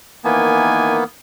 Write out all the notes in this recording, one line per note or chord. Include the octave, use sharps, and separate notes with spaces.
D#3 E3 A#3 B3 G#5